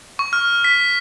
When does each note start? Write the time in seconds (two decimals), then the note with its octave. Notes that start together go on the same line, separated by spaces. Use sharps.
0.19 C#6
0.33 F6
0.64 B6